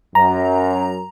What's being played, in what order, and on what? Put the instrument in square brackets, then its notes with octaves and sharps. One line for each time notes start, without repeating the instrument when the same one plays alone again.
[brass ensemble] F#2 [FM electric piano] A#5